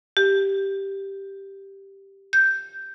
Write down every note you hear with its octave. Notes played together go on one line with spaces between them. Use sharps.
G4
G6